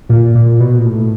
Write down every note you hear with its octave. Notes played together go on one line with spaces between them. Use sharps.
A#2
A#2
B2
A#2
A2